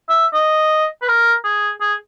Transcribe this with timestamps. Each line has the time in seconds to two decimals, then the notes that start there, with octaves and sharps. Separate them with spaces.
0.09 E5
0.34 D#5
1.02 B4
1.08 A#4
1.44 G#4
1.81 G#4